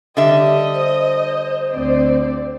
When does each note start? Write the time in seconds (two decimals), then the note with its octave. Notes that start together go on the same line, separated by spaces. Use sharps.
0.17 D3 G3 G4 D#5 E5
0.73 C5
1.71 D2 C4 D5